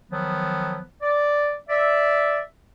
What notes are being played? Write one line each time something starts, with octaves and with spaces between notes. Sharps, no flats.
D#3 F3 F#3 B3
D5
D5 E5